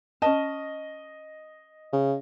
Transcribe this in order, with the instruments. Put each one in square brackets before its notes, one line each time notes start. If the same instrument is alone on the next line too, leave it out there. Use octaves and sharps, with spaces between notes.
[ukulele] C#4 A#4 A5 [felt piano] D#5
[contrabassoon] C#3